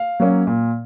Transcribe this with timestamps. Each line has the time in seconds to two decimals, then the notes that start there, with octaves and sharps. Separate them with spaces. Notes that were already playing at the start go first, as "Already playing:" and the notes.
Already playing: F5
0.20 F#3 A#3 C#4
0.47 A#2